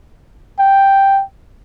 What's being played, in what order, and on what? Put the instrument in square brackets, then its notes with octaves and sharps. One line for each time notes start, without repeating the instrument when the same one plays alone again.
[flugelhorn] G5